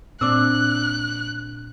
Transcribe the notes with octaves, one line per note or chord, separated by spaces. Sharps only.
A#2 C4 D4 D6 E6 F#6